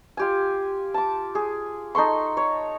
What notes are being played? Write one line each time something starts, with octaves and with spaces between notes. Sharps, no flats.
F4 G4 G#5
A5 D6
G#4
D#4 A4 C6 C#6
C#5